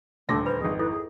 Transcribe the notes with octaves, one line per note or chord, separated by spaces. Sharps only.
D#1 D2 A3 D5 C6 D6 A#6
F4 B4 C5 B5
G#1 F2 G#4
E4 F4 A4 B4
G#4